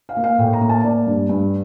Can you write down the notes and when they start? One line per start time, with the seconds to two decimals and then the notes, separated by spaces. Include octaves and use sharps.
0.09 F5
0.17 A#3
0.24 F5
0.38 A2 G5
0.53 A#5
0.61 A#3
0.69 A5
0.83 A#3 D5
1.07 G2
1.29 G2